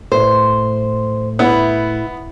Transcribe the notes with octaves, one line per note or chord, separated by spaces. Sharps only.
A2 A3 C5
B3 E4